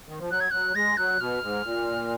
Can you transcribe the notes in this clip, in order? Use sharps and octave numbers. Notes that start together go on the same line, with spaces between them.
D#3
F3
F#3 F#6
G#6
F#3 F#6
G#3 A#6
F#3 F#6
B2 F6
G#2
A#2